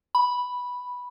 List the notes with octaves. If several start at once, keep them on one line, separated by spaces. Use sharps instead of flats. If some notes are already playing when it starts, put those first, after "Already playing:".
B5